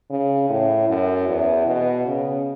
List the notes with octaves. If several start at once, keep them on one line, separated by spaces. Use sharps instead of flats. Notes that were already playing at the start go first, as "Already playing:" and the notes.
C#3
A2
F#2
E2
B2
C#3